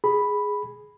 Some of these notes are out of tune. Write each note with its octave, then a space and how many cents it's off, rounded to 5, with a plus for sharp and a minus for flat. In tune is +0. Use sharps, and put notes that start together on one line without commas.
G#4 +0 B5 +0